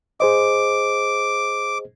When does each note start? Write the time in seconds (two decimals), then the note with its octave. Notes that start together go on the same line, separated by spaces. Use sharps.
0.20 G#4 C5 D#5 D6